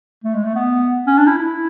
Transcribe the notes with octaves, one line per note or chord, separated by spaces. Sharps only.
A3
G#3
A3
B3
C#4
D4
E4
E4